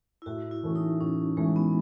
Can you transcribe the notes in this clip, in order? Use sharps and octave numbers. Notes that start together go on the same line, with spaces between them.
E4
A2 F#4
E4
E3 A3 C#4
D#4
A2 C#4
E3 G#3 A3 C#4
B3